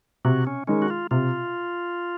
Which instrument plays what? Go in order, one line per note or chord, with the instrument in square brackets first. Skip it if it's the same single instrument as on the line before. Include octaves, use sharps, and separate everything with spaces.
[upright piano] C3 [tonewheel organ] F#4
[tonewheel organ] C#4
[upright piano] D#3 G#3 [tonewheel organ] C#4
[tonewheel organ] F#4
F4
[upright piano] C3 [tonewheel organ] F4